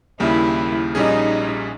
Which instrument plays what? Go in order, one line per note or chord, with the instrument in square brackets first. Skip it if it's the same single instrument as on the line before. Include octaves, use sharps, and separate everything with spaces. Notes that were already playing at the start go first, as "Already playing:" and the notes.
[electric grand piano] D#2 C#3 G3 A#3 [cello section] E4
[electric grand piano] A#1 A#2 G3 C#4 G#4 [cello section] D#4